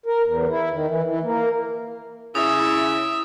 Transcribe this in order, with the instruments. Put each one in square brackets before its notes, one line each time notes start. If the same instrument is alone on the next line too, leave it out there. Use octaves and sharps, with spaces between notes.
[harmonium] A#4
E2
E4
D#3
E3
E3
A#3
[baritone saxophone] C#3 [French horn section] E4 [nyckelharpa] E5 [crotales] D#6